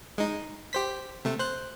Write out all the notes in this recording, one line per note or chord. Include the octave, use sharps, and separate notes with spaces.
G#3 D#4
G4 C5 B6
C3 A3
C5 F#6